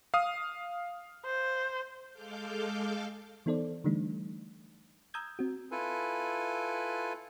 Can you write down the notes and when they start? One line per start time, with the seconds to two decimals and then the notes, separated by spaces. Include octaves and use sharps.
0.14 F5 D#6
1.25 C5
2.11 G#3 A4 F5 D6 F6 G6
3.46 E3 B3 D#4 A4 C5 D5
3.84 D3 E3 G3 A3 D4 D#4
5.14 A#5 D#6 E6 G6 G#6
5.39 C4 F#4
5.71 E4 F4 A4 B4 G#5